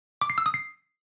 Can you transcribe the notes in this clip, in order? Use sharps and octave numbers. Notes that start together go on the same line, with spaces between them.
D6
C7
E6
D#6
C7